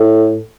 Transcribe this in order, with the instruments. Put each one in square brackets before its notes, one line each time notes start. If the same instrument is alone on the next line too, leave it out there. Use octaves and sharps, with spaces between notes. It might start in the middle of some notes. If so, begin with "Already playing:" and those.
Already playing: [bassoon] A2